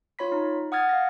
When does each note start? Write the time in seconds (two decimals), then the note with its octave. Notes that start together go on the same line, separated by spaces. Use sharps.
0.19 F4 C#5 B5 B6
0.32 D#4
0.72 F#5 D#6 F6 G#6 A6
0.89 F5 A#6